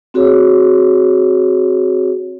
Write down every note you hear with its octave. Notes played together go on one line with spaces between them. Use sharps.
C4 F#4 G#4 C#5